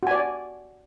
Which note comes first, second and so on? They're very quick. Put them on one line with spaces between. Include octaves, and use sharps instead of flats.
F#4 G#5 D5